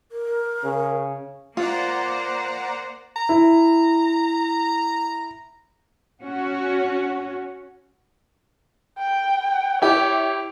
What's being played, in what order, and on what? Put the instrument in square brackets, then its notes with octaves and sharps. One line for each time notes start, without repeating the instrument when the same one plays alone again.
[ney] A#4
[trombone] C#3
[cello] A#3 C5 [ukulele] F4 [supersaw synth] D5 F#5 A#5
[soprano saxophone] A#5
[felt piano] E4
[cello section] C#4 F#4
[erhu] G5
[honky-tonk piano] E4 G4 [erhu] C#5